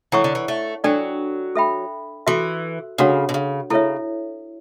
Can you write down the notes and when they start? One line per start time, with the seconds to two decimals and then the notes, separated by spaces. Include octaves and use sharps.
0.12 E3 E4 A4 C#5 F#5 C#6
0.24 D3
0.35 E3
0.48 A3
0.84 F#3 D4 A4 D5 G5
1.56 A4 E5 G5 B5
2.27 E3 F#4 A4 E5
2.98 C#3 D4 F#4 A4 C#5 F#5
3.29 B2
3.34 C#3
3.70 C#3 E4 A4 C#5 E5